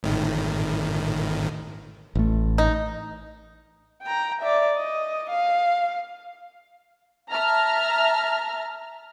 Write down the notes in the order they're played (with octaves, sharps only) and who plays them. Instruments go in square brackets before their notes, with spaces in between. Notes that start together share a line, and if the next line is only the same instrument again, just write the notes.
[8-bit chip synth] G#1 A2 D#3
[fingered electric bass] A1 A3
[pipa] D#4
[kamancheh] G5 A#5
D5 E5
D#5
F5
[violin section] E5 A5 A#5 F6